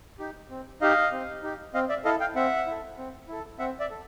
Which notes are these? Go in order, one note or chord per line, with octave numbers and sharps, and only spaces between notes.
D#4 G4
C4
D#4 G4 D#5 F5
C4
D#4 G4
C4 D#5 F5
D5 E5
E4 A4 D#5 F5
F5 G5
C4 E5 F#5
E4 A4
C4
E4 A4
C4 E5 F#5
D5 E5
A4